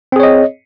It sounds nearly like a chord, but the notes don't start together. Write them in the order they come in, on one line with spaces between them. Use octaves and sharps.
C4 G#4 C#5 D#5